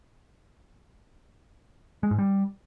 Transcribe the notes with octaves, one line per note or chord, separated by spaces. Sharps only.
G#3
G#2
G3